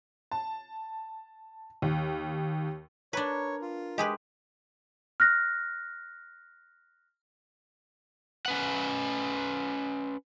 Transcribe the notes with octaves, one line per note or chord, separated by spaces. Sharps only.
A5
D#2
D4 A#4 B4 C#5
F4
G#3 G4 G#4 B4
F6 F#6 A#6
C#4 B4 F#5